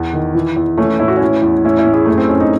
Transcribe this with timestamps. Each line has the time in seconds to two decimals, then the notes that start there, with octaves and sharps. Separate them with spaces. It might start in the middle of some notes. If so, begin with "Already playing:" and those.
Already playing: E2
0.13 D#3
0.35 E3
0.57 E2
0.77 E3 A3 C#4
0.99 A2 E4
1.08 F#4
1.17 E3 C#4 E4
1.42 E2
1.65 A2 C#4 E4
1.79 C#4 E4
1.86 A2
1.94 E4 G#4
2.05 F#2 A3
2.18 C4
2.29 F#2 C#4
2.40 D#4